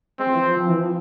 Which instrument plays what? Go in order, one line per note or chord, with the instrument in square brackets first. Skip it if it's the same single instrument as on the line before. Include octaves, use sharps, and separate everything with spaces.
[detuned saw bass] G#3 [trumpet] C4
[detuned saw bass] F3
E3
F3
F3
E3
F3